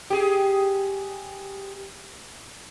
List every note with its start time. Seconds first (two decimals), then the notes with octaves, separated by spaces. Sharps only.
0.10 G4 G#4